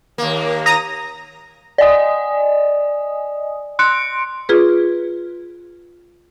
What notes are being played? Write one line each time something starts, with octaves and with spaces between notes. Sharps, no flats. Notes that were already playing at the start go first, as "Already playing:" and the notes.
D#2 A#3
A#5 D#6 A#6
D5 D#5 G#5 D#6
C6 F#6 C#7 D7
F4 G#4 B4